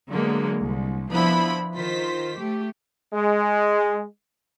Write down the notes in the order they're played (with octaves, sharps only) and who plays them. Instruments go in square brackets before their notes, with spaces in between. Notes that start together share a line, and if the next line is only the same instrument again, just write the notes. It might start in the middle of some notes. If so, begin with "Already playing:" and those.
[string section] D3 F#3 G#3 A#3 B3
C2
F3 B3 D4 E4 C5 B5
D#3 F4 C5 B6
A3 G4
[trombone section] G#3